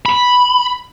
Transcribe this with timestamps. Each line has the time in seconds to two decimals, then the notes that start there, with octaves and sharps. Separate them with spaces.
0.06 B5